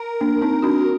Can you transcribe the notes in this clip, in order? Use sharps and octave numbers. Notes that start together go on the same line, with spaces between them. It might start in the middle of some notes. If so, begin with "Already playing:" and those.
Already playing: A#4
A#3 D4
C4 D#4
D4 F#4
F#4